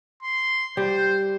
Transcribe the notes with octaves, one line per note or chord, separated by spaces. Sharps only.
C6
G3 C5